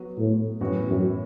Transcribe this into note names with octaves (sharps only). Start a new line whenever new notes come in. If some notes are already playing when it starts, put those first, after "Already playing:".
Already playing: F#3 B3 F#4
A2
F#2 A2 E3 B3 F#4
F#2